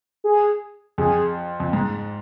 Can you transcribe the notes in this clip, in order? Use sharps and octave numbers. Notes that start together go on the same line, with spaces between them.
G#4
F2 G#4
F2
G#2